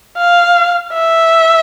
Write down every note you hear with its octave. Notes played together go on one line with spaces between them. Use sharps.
F5
E5